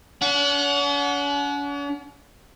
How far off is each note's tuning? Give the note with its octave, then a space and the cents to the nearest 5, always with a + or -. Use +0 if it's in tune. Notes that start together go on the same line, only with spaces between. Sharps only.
C#4 +45 F#5 -10